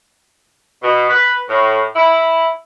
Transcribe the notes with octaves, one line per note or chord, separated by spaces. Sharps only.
B2
B4
A2
E4